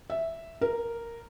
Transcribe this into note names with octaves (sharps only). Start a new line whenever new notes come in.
E5
A#4